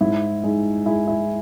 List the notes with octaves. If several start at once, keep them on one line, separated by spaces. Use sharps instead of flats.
G#2 E4
G#3 D#4
G#3 E4
E4